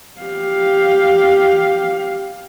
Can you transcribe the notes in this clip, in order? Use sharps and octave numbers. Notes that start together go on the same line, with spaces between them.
G4 F5